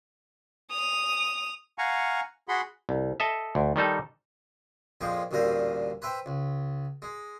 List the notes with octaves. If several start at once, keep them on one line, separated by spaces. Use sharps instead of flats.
D#6 F7
F5 F#5 G#5 A#5 C#6
F#4 G#4 F#5 B5 C6
C2
A4 D#5 E5
D2
D#3 G3 D#4 A4
A#1 F2 F3 G#3 G5
A1 D2 G2 A#2 A#4 C5
B4 C5 E5 G5
C#2
G#3